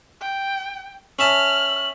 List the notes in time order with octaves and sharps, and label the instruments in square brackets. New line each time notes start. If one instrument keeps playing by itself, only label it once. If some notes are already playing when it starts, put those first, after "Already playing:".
[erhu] G5
[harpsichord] C#4 E5 A5 [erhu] F6 [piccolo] F#7